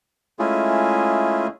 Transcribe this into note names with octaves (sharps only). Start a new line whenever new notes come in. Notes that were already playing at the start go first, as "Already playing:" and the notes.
G#3 A3 C#4 E4 F4 G#4